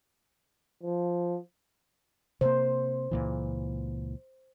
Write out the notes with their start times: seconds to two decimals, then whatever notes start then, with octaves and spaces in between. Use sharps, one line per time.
0.83 F3
2.41 C3 A#3 C5
3.11 C#2 A#2 E3